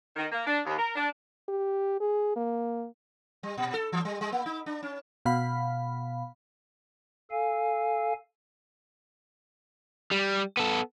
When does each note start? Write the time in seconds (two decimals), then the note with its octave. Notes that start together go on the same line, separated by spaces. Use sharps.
0.16 D#3
0.31 A#3
0.47 D4
0.66 D#2
0.77 A#4
0.96 D4
1.49 G4
2.00 G#4
2.36 A#3
3.43 G3
3.57 A#2
3.74 A4
3.92 E3
4.05 G3
4.21 G3
4.32 A#3
4.46 D#4
4.66 D4
4.83 C#4
5.26 B2 F5 B5
7.31 A4 F5 G#5
10.11 G3
10.57 B3 A4